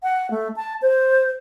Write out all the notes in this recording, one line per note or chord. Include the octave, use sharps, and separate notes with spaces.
F#5
A3
A5
C5